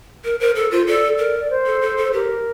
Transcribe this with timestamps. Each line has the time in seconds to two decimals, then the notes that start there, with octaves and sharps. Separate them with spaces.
0.24 A#4
0.40 A#4 C5
0.55 A4 A#4
0.71 F4 C5
0.87 A4 D5
1.19 A#4
1.39 D5
1.50 C5
1.66 A4
1.82 A4
1.97 A4
2.08 C5
2.13 G4 A#4